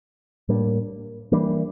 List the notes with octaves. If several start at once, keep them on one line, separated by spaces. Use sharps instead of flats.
A2 G3 A#3 D4
E3 G3 A#3 D4